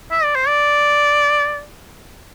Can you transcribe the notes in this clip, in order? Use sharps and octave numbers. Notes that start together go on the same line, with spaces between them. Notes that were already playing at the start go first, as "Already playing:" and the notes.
E5
D5
C5
D5